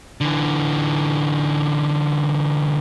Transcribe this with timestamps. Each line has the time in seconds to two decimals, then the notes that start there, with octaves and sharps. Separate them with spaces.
0.21 D3 E3